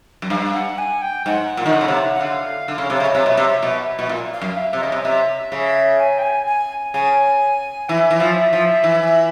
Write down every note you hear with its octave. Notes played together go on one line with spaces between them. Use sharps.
F#2
G2 F5
F#5
G#5
G5
G#2 F#5
A#2
D#3
D3
C#3
C3
F#5
D3 F5
D3
C#3
C3
C#3
D#5
C3 E5
B2
C3
B2
B2
A#2
F5
F#2
E5
C3
C#3 D#5
C3
C3 E5
C#3
G#5
G5
G#5
G#5
C#3 G#5
E3 E5
E3
F3
F3
E3